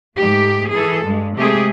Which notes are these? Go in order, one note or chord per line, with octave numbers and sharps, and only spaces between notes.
G#2 A3 G4
E3 G#4 A4
G2 G#3
C3 G#3 A3 C4 G4 G#4